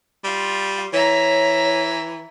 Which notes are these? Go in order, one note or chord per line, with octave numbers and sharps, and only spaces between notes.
G3 F4
E3 C#5 E5 A#5